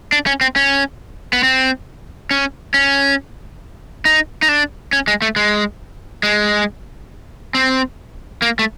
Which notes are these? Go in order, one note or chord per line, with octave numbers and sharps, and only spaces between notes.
D4
C#4
C4
C#4
B3
C4
C#4
C#4
D#4
D#4
D4
C#4
G#3
A3
G#3
G#3
C4
A#3
A3